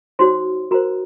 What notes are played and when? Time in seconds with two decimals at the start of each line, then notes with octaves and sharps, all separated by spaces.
0.19 D#4 F#4 C5 C#5 C6
0.71 F#4 A#4 C5 A#5